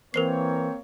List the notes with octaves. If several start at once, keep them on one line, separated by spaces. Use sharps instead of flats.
E3 A#3 C4 A#4 C5 C#5 C7